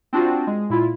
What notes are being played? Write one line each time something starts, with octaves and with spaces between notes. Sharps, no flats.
C4 D4 F4 F#4
G#3
A#2 E4 F4